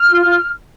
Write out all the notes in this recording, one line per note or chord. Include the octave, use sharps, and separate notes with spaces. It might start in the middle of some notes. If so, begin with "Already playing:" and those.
Already playing: F6
F4
F4